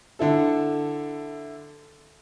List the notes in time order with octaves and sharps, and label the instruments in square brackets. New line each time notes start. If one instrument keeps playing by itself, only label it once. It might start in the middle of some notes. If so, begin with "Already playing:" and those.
[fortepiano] D3 E4 A4